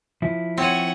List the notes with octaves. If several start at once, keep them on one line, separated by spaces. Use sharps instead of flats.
F3 E4
C4 C#5 F#5 G#5